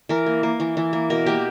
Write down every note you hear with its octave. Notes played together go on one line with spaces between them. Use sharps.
E3 A#4
A#3
A#3
E3
E3
A#3
B2 A#4
A#3 G4